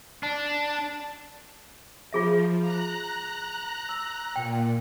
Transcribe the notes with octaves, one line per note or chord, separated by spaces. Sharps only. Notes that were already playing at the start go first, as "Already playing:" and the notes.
D4
F3 F4 G#4 E5
A#5 F#6
E6
A#2 G5